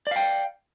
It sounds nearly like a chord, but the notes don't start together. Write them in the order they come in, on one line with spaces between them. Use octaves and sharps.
D5 F5 G5